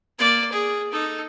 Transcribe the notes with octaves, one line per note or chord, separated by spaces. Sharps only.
A#3 D5
G#4
D#4 A4